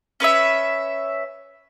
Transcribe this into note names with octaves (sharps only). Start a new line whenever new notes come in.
C#4 B4 C#5 E5